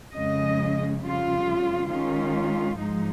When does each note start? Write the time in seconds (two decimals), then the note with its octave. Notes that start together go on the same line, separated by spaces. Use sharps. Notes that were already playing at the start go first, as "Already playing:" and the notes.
0.13 F2 C#3 G#3 D#5
1.02 F2 C#3 G3 F4
1.89 D#3 G#3 C#4 F4
2.77 G#2 F3 G#3 D#4